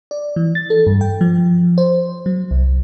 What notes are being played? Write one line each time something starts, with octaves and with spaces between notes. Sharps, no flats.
D5
E3
A6
A4
G2
G5
F3
C5
F#3
C2